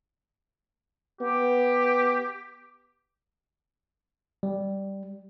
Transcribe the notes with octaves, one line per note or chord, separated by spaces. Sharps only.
B3 G4
G3